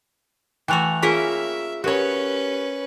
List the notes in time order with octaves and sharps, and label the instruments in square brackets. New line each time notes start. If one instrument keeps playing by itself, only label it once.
[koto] E3 A3 F#4 [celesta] G5 F#6 F7
[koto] A#3 C#4 A#4 [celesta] F4 G#4 B6 [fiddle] E5
[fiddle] C#4 B4 [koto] F#4 C#5 [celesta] G4 A#4